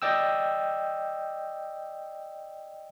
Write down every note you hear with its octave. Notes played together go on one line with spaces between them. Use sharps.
D5 D#5 G5 E6